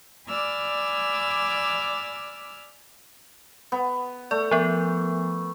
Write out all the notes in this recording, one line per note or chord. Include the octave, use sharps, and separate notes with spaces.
D5 G#5 B5 D6 E6 F6
B3
A3 D5
F3 B3